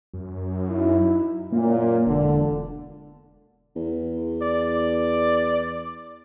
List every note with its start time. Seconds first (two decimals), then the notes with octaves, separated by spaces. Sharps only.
0.14 F#2
0.69 D#4 E4
1.52 F#2 A#2 A#3
2.07 E1 D3
3.75 E2
4.42 D5